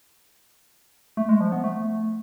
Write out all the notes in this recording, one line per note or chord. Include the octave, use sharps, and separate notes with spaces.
A3
G#3
F3
B3
A3